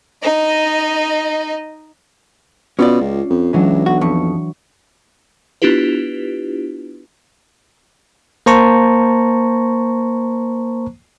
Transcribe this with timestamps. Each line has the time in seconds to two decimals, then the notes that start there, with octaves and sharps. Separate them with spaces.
0.23 D#4 D#5
2.79 B2 C#4 F4 D5
3.01 C#2
3.30 F2
3.53 C#2 E3 F#3 D4
3.86 B1 F#4
4.01 F2 C#6
5.62 B3 D4 E4 F4 G4 B4
8.46 A#3 C5 A5 A#5 C#6